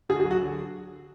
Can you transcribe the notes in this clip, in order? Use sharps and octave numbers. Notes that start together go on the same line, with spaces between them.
D3 G#4
F#4
G#4
F#3
F#4
D3